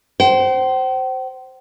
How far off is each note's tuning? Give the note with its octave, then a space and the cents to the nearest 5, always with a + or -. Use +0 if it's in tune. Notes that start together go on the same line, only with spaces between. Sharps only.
C5 +0 G5 -45